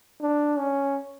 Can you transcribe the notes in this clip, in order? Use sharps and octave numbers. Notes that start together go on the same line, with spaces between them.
D4
C#4